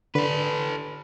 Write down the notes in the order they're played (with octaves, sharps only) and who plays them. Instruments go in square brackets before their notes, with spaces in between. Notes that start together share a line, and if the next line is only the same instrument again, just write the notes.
[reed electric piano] D3 [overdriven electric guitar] A4 B4